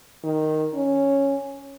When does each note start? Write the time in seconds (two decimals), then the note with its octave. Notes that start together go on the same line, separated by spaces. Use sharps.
0.24 D#3
0.75 C#4